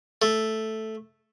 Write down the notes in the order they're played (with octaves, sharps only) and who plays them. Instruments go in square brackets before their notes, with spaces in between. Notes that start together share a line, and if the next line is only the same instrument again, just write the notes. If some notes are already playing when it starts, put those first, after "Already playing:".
[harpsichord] A3